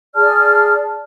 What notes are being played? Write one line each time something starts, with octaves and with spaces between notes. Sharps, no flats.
G#4 D5 A5 F6